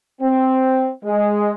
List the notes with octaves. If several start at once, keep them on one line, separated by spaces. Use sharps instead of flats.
C4
G#3